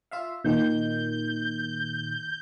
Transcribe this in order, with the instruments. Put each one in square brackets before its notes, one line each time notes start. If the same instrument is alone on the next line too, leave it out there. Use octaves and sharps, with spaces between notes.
[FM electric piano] F4 E5 F5
[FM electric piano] A#2 D#3 [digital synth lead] G6